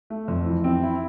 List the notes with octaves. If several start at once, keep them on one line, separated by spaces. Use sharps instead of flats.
A3
F2
E3
C4
E4